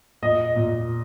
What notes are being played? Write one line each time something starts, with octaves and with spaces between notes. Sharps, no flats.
A#2 D#5
A#2